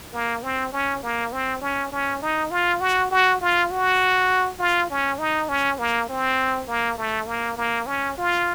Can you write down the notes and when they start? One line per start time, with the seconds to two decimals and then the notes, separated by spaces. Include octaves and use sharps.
0.13 A#3
0.43 C4
0.72 C#4
1.03 A#3
1.32 C4
1.62 C#4
1.92 C#4
2.22 D#4
2.51 F4
2.81 F#4
3.11 F#4
3.41 F4
3.71 F#4
4.59 F4
4.90 C#4
5.19 D#4
5.49 C#4
5.79 A#3
6.09 C4
6.68 A#3
6.98 A3
7.27 A#3
7.57 A#3
7.87 C#4
8.18 F4